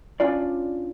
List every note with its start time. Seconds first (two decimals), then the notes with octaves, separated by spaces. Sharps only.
0.20 C#4 D4 F4 D5